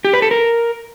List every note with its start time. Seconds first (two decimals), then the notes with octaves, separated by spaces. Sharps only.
0.05 G4
0.13 B4
0.22 A4
0.31 A#4